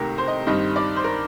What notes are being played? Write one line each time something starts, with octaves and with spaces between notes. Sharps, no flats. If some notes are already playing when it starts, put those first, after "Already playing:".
Already playing: C2 C3 D#3 A3 G4 A#4
C5
D#5
G2 D#3 G3 C4 D#5
D5
C5
A#4